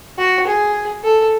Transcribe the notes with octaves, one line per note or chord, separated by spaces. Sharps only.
F#4
G#4
A4